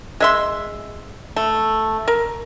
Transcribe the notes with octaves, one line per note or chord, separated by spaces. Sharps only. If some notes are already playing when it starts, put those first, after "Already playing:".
G#3 E5 C6
A3
A#4